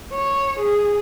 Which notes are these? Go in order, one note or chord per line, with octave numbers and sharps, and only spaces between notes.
C#5
G#4